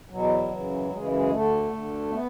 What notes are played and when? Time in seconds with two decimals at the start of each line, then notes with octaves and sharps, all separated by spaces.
0.10 E2 B2 F#3
0.50 F#2 C#3 E3
0.90 F#2 C#3 E3 G#3
1.10 G#3
1.30 D2 D3 A3
1.71 D2 D3
2.11 B3